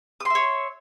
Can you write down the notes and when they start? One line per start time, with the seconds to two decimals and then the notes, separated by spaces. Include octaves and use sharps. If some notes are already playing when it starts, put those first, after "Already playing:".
0.20 D#6
0.25 C6
0.30 E5
0.35 C#5